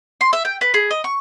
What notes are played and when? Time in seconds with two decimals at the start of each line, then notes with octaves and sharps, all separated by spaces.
0.21 C6
0.33 E5
0.45 G5
0.61 B4
0.74 G#4
0.91 D#5
1.04 C#6